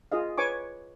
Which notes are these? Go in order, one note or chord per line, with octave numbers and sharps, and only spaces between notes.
F4 G#4 D#5 F5
B4 C#5 G#5 C#6 D6